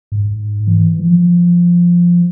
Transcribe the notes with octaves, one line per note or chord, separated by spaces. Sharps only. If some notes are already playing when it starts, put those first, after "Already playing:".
G#2
E3
F3